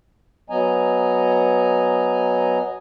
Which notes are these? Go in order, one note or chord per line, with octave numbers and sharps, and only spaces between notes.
F#3 B3 D#5 G#5 A#5